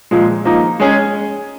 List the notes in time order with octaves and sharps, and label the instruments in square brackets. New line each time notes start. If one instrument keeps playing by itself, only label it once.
[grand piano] A#2 F3 G#3
F3 A#3 D#4
G#3 C#4 G#4